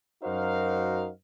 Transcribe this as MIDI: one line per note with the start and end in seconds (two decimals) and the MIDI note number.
0.24 1.09 42
0.24 1.09 63
0.24 1.09 66
0.24 1.09 70
0.24 1.09 72
0.24 1.09 77